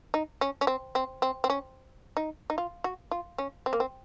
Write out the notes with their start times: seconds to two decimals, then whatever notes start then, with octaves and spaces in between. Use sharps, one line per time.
0.14 D#4
0.41 C#4
0.61 C#4
0.67 C4
0.95 C4
1.22 C4
1.44 C4
1.50 C#4
2.17 D#4
2.50 D#4
2.58 F4
2.84 F#4
3.11 F4
3.38 C#4
3.66 C4
3.73 A#3
3.80 C4